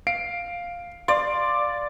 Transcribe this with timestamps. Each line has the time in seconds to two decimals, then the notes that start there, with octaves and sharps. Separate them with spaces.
0.07 F5 C7 D7
1.08 D5 F5 C6